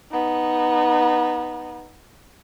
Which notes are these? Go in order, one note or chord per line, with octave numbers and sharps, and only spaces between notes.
B3 D#4